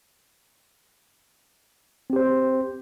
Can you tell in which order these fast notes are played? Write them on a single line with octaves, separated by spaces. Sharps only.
C4 G4 C5